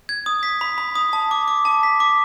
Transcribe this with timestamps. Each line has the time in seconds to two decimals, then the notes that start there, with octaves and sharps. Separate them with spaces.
0.09 G#6
0.26 D#6
0.43 B6
0.61 B5
0.78 B5
0.95 D#6
1.13 A5
1.31 D6
1.48 D6
1.65 A5
1.83 B6
2.00 D6